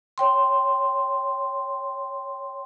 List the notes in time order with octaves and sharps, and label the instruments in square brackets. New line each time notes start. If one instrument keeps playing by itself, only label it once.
[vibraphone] C#5 G5 C6